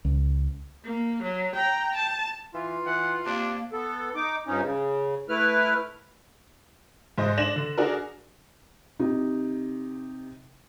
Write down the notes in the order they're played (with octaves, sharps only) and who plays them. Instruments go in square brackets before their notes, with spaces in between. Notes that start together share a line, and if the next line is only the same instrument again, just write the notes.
[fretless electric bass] C#2
[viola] A#3
F#3
G5 A#5
A5
[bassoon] E3 [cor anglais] F4
[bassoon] E3 [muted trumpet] F#5
[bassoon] C3 [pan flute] A#3 [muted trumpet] D4
[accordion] B3 A4
D#4 D6
G2 F3 C#4 D#4
C#3
A3 E4 B4 F6
[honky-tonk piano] G#2 C5 D#5
D4 A#6 E7 F#7
D3
D4 F#4 G#4 A#4
[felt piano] C3 D#4